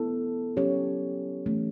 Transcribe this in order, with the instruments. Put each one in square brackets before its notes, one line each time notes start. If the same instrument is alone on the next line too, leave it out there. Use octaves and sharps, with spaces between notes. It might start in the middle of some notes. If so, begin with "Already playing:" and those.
Already playing: [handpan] B3 E4 A4
F#3 C#4 G4 C#5
E3 A3 C#4